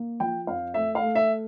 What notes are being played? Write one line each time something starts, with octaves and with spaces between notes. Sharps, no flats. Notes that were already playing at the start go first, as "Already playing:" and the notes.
Already playing: A#3
F3 G5
F2 F5
A3 E5
F5
A3
E5